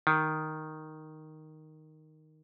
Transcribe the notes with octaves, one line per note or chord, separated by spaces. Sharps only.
D#3